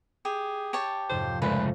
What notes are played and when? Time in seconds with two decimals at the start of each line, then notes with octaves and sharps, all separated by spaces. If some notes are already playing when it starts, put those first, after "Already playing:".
0.25 G4 G#4
0.73 G4 C#5 A5
1.09 F2 G#2 C3 C5
1.42 A#2 C#3 G#3 A3 B4